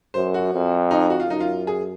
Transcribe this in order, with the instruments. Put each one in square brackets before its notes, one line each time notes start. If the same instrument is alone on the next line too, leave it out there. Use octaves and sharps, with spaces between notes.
[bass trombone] F#2 [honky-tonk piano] C5
[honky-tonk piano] F#4
[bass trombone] F2
[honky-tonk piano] D#4
F#4
F4
[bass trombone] F#2 [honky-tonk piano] D#4
[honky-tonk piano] F4
G#4